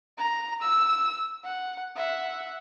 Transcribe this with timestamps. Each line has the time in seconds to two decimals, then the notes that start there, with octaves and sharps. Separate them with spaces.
0.18 A#5
0.62 E6
1.44 F#5
1.96 E5 F#5